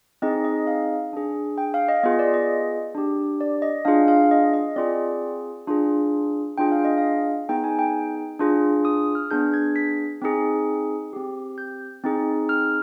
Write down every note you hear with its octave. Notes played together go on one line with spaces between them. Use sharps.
C4 D#4 G#4 D#5
D#5
F5
D4 G#4
G5
F5
D#5
B3 F4 G#4 D#5
D5
D#5
D4 G4
D5
D#5
D4 F4 G#4 F5
F5
D#5
D#5
C4 F4 G#4 D5
D4 F4 G#4
D4 F4 G#4 G5
F5
D#5
F5
B3 D#4 G#4 G5
G#5
G5
D4 F4 G#4
D#6
F6
B3 D4 G#4 G6
G#6
B6
C4 D#4 G#4
C4 G4
G6
C4 D#4 G#4
F6